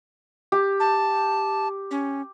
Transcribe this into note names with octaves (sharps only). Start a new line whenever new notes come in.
G4
A5
C#4